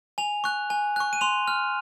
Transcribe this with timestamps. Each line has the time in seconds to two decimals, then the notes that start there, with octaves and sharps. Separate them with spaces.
0.18 G#5 F7
0.44 C#6 F#6
0.70 G#5
0.96 C#6 F#6
1.13 D#7
1.21 C6 F7
1.48 F6